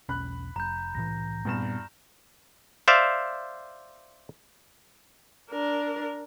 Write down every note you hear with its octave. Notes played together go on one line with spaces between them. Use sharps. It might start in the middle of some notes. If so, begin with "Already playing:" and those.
E1 B1 C#4 B5 F#6
F1 A#5 G6
C2 A2 E3 A#6
E2 G2 A#2 C4 E7
C5 D5 E5 F5
D4 A#4